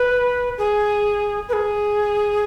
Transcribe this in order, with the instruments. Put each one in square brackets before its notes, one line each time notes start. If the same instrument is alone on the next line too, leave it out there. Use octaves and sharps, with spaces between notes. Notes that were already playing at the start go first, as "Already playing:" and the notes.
Already playing: [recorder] B4
G#4
B4
G#4